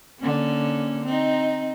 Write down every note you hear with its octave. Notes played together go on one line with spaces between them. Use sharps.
D3 A#3 C#4
C4 D#4